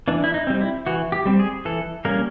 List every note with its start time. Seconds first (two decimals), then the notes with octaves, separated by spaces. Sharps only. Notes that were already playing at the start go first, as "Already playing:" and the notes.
0.08 E3 D4
0.24 E4
0.34 D#4
0.47 G3 C4
0.61 E4
0.86 E3 F#4
1.12 G4
1.26 G3 C4
1.39 G#4
1.65 E3 A4
2.05 G3 A#3 C#4 A#4